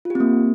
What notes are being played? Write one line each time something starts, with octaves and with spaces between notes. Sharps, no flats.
A#3 C4 F4 G4